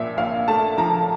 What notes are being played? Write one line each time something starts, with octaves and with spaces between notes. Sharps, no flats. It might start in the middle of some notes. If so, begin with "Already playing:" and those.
Already playing: A#2 F3 E5
A#1 F5
A3 A5
F3 A#5